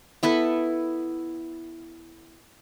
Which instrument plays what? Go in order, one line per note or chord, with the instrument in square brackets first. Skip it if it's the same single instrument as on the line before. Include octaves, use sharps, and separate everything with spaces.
[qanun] B3 E4 A4 B4